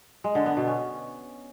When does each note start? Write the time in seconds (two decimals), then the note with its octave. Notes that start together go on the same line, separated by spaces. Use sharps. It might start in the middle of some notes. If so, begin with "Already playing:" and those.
0.24 G#3
0.35 D3
0.46 B3
0.57 B2
0.68 C#4